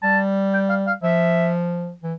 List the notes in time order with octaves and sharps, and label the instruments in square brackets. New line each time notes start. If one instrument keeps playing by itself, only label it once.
[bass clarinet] G3 [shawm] A5
[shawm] G5
F5
F5
[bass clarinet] F3 [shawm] E5
[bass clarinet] E3